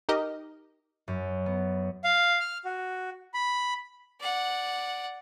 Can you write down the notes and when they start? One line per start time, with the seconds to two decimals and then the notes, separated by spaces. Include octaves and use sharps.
0.09 D#4 G4 A#4 D#5
1.08 F#2
1.46 B3
2.04 F5
2.40 F6
2.65 F#4
3.34 B5
4.21 D5 F#5